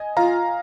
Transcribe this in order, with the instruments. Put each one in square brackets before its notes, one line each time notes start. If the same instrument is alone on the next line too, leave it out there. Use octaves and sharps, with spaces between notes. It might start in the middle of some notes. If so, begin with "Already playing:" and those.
Already playing: [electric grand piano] D#5 G#5
[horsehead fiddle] F4 [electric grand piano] F5 A#5